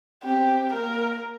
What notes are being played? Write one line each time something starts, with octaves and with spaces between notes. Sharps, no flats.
C4 G4
A#3 A#4